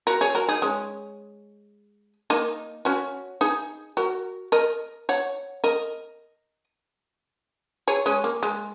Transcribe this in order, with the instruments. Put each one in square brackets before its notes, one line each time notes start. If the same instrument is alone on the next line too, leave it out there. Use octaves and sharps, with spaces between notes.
[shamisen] F#4 A#4
G#4 C#5
F#4 A#4
D#4 G#4
G#3 C#4
A#3 D#4
C#4 F#4
D#4 G#4
F#4 A#4
A#4 D#5
C#5 F#5
A#4 D#5
G#4 C#5
G#3 C#4
A#3
G#3